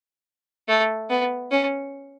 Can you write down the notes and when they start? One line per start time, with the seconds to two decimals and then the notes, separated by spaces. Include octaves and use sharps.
0.68 A3
1.10 B3
1.51 C#4